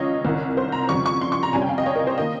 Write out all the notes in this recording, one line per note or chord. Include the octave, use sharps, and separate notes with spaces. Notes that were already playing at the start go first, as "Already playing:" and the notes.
Already playing: C#2 C#3 F3 C#5 D#5 F5
C2 C3 D#3
C5
A#5
F2 C#3 G3 C#6
C#6
C6
C#6
A#5
C3 G3 C#4 G#5
G5
F5
D#5
C#5
A#4
C5
D#3 A#3 D#5